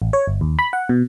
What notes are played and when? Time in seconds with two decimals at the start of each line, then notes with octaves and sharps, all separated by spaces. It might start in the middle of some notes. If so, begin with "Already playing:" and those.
0.02 A1
0.13 C#5
0.27 G1
0.41 D#2
0.59 B5
0.73 F#5
0.89 B2